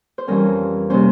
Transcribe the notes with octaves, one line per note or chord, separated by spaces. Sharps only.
C5
F2 E3 G3 C#4 A#4
C3 G3 A#3 C#4 C5